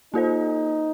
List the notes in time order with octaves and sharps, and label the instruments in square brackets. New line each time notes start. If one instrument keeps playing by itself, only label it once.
[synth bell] A#3 F4 A4 C5 [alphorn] D#4